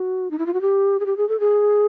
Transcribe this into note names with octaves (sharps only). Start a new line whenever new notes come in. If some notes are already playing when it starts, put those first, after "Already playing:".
Already playing: F#4
D#4
E4
F4
F#4
G4
G#4
G4
G#4
A4
G#4